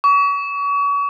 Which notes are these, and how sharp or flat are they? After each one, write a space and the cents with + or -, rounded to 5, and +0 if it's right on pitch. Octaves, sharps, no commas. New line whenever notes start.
C#6 +35